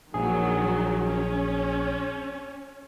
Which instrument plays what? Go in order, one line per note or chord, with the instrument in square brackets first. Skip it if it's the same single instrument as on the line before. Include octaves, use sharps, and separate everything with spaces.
[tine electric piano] A#1 G#4 [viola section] D#3 F#3
[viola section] C#4